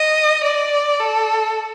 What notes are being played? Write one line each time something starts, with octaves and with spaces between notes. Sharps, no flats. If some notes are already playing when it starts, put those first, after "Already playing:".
Already playing: D#5
D5
A4